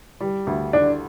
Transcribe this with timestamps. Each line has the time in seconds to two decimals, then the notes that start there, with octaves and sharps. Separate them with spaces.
0.20 G3
0.47 D2
0.73 D3 D4